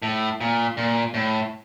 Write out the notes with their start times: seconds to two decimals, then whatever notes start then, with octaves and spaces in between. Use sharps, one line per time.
0.02 A2
0.41 A#2
0.77 A#2
1.14 A2